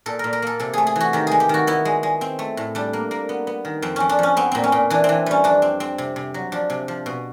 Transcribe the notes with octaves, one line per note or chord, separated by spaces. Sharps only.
A#2 A4
A#2 A#4
A#4
A#3 A4
C3 A4
A3 G#4
G#4
E3 F#4
D#3 G4
G#3 G#4
G4
D#3 F#4
B3 E4
G#3
G#3
C4
A3
A2
G3 D4
A#3
A#3
B3
B3
D#3
F2 C4
F2 C#4
D4
F3 C#4
B3 C4
A#2 C4
C#4
A#2
E3 D4
E3 C4
G3 C#4
F2 D4
C4
C4
C3
C3
F#3
F3 D4
C3
F3
B2